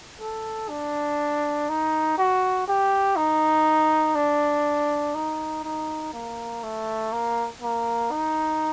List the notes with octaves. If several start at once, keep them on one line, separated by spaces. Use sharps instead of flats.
A4
D4
D#4
F#4
G4
D#4
D4
D#4
D#4
A#3
A3
A#3
A#3
D#4